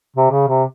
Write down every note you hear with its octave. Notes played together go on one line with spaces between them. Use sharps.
C3
C#3
C3